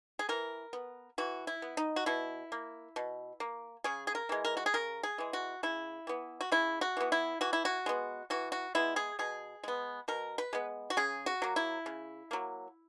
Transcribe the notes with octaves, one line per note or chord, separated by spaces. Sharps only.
G#4
E3 A#4
B3
E3 F#4
E4
B3
D#4
F#4
B2 E4
A#3
B2
A#3
C#3 G#4
G#4
A#4
E3 G#3
A#4
F#4
G#4
C#3 A#4
G#4
E3 G#3
F#4
C#3 E4
E3 B3
F#4
C#3 E4
F#4
E3 B3
E4
E3 F#4
E4
F#4
G#3 B3
E3 F#4
F#4
G#3 B3 E4
G#4
B2 G#4
G#3 B3
B2 A#4
B4
G#3 B3
F#4
C#3 G#4
F#4
F#3 A#3
E4
C#3
F#3 A#3